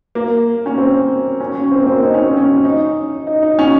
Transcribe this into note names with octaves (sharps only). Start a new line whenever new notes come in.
A#3
C#4
C4
C#4
C#4
C4
A#3
C4
D#4
C#4
C4
C#4
D#4
D#4
D#4
C#4